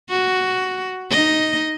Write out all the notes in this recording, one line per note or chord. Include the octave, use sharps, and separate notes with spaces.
F#4
D#4 D#5